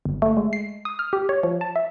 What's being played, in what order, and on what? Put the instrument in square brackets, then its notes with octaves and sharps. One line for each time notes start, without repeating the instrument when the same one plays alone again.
[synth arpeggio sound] G1
A3
G#3
C7
D#6
F6
G4
C#5
F3
A5
E5